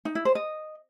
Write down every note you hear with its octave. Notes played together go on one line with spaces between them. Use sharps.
D#4
E4
C5
D#5